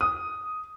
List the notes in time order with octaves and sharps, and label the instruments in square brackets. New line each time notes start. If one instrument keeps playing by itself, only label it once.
[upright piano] D#6